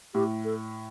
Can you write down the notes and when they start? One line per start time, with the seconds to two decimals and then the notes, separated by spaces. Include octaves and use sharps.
0.14 A2 G4
0.45 A4